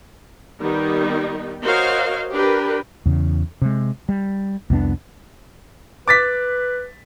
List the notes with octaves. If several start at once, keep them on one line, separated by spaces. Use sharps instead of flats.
D#3 G3 B3 D#4
F#4 A#4 C5 C#5 D#5 F5
D4 G4 A#4 B4
E2 C#3
C3 G#3
G3
C2 F2 B3 D4
B4 D6 A6 B6